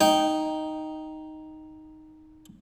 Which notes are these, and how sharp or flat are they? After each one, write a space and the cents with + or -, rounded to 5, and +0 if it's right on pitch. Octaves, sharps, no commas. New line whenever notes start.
D#4 +0 G5 -10